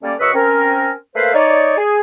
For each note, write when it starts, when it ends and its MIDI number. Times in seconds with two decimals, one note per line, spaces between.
0.03 0.14 55
0.03 0.14 57
0.03 0.14 58
0.03 0.14 61
0.03 0.14 74
0.20 0.33 42
0.20 0.33 49
0.20 0.33 71
0.20 0.33 75
0.20 0.33 85
0.20 0.33 88
0.34 0.91 60
0.34 0.91 61
0.34 0.91 70
1.15 1.31 57
1.15 1.31 58
1.15 1.31 71
1.15 1.31 72
1.15 1.31 77
1.34 1.76 63
1.34 1.76 73
1.34 1.76 74
1.77 2.01 68